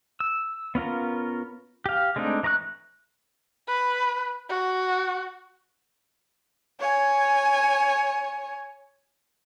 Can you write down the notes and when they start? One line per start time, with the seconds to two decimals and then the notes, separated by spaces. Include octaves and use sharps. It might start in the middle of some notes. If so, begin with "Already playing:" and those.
0.20 E6
0.75 B3 C#4 F4 A#4
1.86 G4 F5
2.16 G#3 A3 C4 D4 D#4
2.43 E3 A#5 C#6 D6 F#6
3.67 B4
4.49 F#4
6.80 C#5 G#5